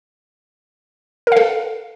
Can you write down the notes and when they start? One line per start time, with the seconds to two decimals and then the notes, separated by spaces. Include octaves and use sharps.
1.27 A#4
1.32 F5
1.37 A4